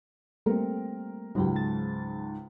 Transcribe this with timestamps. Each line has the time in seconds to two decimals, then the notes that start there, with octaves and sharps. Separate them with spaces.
0.46 G3 A3 A#3 C4 A#4
1.35 C#2 G#2 F#3 F#4 G4
1.55 F#3 A5 A6